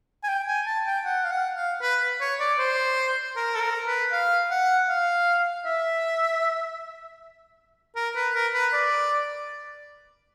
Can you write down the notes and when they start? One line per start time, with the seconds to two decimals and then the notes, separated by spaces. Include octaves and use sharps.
0.23 G#5
0.28 G5
0.47 G#5
0.66 A5
0.86 G5
1.05 F#5
1.24 F5
1.31 F#5
1.56 F5
1.81 B4
2.21 C#5
2.40 D5
2.59 C5
3.36 A#4
3.55 A4
3.61 A#4
3.86 B4
4.12 F5
4.51 F#5
4.88 F5
5.65 E5
7.96 A#4
8.15 B4
8.34 A#4
8.54 B4
8.73 D5